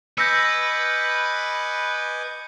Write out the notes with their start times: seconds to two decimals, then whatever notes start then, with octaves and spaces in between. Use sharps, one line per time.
0.18 B4 D#5 G#5 D6 E6 G6 A#6 C#7